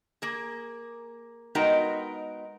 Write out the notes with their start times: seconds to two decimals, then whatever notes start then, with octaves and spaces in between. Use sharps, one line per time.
0.22 A#3 G#4
1.55 G#3 B3 D#4 F#4 A#4 G5